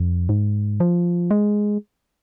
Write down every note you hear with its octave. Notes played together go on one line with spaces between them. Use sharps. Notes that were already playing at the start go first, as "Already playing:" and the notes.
Already playing: F2
G#2
F3
G#3